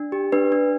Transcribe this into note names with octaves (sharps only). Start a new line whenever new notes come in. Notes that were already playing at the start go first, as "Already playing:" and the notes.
Already playing: D4
G4
D4 B4
D4